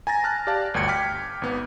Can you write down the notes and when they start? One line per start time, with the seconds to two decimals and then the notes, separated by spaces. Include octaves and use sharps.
0.07 G#5 A#5 A6 A#6
0.24 A5 F6 F#6
0.47 G4 D5 F5 A5
0.74 G1 D2 G5 G#6 C#7
0.88 G5 D6 F6 B6
1.42 G#1 B3